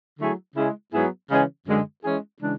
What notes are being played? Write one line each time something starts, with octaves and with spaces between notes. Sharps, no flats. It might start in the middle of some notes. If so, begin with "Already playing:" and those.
D3 F#3 A3 E4 G#4
C#3 G#3 C#4 E4 G#4
G#2 F#3 B3 E4 G#4
C#3 E3 G#3 C#4 G#4
F#2 D3 G#3
E3 G#3 C#4 E4 G#4
C#3 E3 G#3 D4